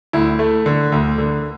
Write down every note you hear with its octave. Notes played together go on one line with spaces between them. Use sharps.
D2 E4
A3
D3
D2
D3